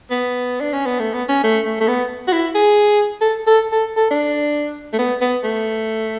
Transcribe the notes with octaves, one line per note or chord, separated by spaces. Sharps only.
B3
D4
C#4
B3
A3
B3
C#4
A3
A3
A3
B3
F#4
E4
G#4
A4
A4
A4
A4
D4
A3
B3
B3
A3